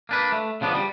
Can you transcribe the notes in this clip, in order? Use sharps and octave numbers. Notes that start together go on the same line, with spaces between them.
A#3 D4 B4
A3
C#3 F3 B3 D4
G3